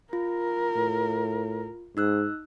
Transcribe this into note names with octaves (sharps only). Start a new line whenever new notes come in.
F4 A#4
A2
G#2 D#4 E6 F#6